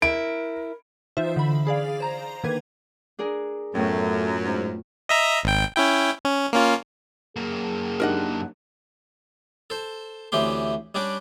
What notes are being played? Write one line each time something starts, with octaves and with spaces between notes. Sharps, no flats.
E4 A#4 D7
E3 D#4 F4 C5 E5
D3 B5
G#4 D5 F5
C5 A#5
D3 D#3 A#3 B4 G#6
D4 G#4 A#4
F#2 A2 A3 B3 F4
G#2
D#5 E5 A#5
G#1 G5
C#4 E4 G5
C#4
A#3 C#4 F4
F#2 A#3 G#4
D4 D#4 G4 A#4 D#5 F#5
A4 C5
D2 E3 C4 C#4 G4 C6
G3 C#4 D4 G4 D5